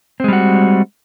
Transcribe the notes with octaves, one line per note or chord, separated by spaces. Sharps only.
G3 G#3 C4 F#4